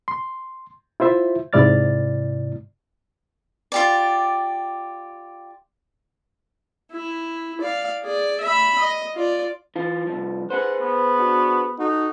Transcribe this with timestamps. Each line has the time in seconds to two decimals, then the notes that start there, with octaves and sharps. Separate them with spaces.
0.08 C6
1.00 E4 F4 C5 E5
1.53 G#2 C3 E4 D5 F6 A6
3.72 F4 G4 D5
6.92 E4
7.61 D5 F5
8.02 G#4 D5
8.40 E5 B5
8.78 D#5
9.14 F4 D5
9.76 E3 F4
10.07 C2 G#2 F3
10.50 G#4 B4 C5 F#5
10.81 B3
11.17 D4 F#4
11.77 D#4 F#4 A4